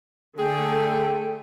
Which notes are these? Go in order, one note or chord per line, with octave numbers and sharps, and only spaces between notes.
D3 A3 G#4 A4 G5